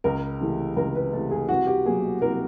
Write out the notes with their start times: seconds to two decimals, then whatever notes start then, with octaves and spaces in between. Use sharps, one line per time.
0.04 C#2 A#4
0.40 C3 E3 A3
0.76 C#2 A#4
0.95 B4
1.13 C3 E3 A3 A4
1.31 G#4
1.49 C2 F#4
1.67 G4
1.86 B2 F#3 A#3 G#4
2.21 C2 A#4